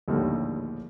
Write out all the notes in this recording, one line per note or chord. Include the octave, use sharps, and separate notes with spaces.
A#1 D#2 A2 D3 D#3 G3